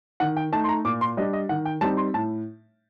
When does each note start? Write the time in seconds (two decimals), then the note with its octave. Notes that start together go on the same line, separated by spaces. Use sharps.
0.20 D#3 F#5
0.37 G5
0.52 A3 D#4 A5
0.64 C6
0.69 A#5
0.85 A#2 D6
1.01 C6
1.17 G3 D4 D#5
1.33 D#5
1.49 D#3 F#5
1.66 G5
1.81 G3 C4 D#4 A5
1.97 C6
2.14 A2 A5